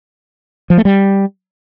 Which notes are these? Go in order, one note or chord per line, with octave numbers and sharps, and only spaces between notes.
F3
A3
G3